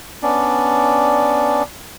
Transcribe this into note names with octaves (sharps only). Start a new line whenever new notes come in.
B3 C#4 D4 D5